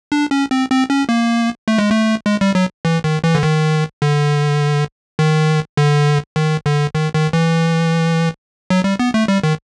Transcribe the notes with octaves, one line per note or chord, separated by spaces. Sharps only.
D4
C#4
C4
C4
C#4
A#3
A3
G#3
A3
G#3
G3
F#3
E3
D#3
E3
D3
D#3
D3
D#3
D3
D#3
D3
D#3
D#3
E3
F#3
G3
B3
A3
G3
D#3